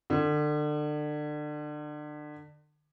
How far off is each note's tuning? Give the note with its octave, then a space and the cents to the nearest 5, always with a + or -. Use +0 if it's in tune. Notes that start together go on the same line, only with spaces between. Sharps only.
D3 +30